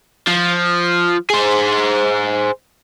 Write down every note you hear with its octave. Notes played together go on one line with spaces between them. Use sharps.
F3
G#4 C5